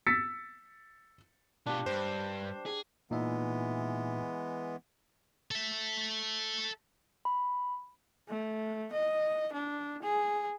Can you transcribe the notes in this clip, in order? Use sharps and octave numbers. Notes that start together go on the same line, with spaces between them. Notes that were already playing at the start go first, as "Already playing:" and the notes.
E6 A6 B6 C#7
B2 D4 F4 G4
G2 C5
G#4
A#2 E3 G#3 B3 D#4 E5
A4 E5
B5
A3
D#5
D4
G#4